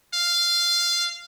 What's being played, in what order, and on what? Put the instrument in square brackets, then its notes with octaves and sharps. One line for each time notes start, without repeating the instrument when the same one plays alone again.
[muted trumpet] F5